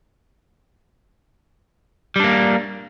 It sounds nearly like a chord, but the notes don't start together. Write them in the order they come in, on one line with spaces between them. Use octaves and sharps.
G3 D4 A#3